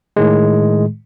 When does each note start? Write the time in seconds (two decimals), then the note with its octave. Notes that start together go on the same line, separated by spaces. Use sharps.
0.16 A2 D#3 G#3